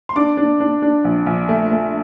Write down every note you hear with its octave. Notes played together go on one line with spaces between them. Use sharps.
C6
D4 D6
D4
D4
D4
A#1
A#1
A3
A3